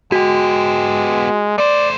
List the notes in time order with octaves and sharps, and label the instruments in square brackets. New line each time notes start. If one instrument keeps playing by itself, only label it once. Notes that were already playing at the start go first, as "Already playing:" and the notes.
[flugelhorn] G#3 [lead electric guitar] B3 G4 [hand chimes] F#4
[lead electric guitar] A3 C5 [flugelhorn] D5